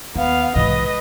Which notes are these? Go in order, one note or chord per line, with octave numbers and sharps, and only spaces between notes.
D#2 B3 F5
B1 G#2 C3 E3 B4 D#5